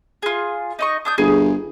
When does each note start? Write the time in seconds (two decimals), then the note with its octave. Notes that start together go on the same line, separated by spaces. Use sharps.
0.22 F4 G#4
0.79 D#4 D#5 C#6
1.05 D4 D#6 G6
1.18 G1 G#4